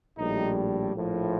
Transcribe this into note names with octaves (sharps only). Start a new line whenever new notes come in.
A#1 A2 G3 D#4
A#1 A2 F3